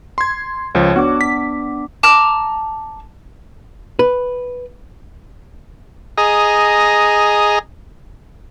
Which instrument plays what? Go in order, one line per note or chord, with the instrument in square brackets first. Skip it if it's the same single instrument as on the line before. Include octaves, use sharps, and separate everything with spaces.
[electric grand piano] C6 G#6
[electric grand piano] C#2 F3 [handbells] C#5
[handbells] B3 D4 D6 [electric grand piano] F#4
[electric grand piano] B6
[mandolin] A5 A#5 D6 F6
[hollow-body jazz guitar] B4
[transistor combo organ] G#4 D#5 A#5